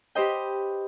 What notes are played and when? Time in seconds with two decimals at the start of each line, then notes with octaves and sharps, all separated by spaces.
0.15 G4 B4 C5 D#5 G5